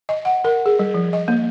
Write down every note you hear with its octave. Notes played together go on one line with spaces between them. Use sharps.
D#5
F#5
A#4
G#4
G3
F3
D#5
A#3